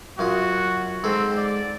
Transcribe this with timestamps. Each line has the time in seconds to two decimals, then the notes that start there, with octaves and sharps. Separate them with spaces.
0.19 F#2 F4 F#4 D#6
1.04 G#2 C4 A4
1.37 D5